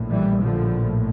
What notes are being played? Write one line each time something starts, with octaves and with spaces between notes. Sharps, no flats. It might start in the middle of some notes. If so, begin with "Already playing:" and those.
Already playing: A#1 A2
E3 G3
D3 F3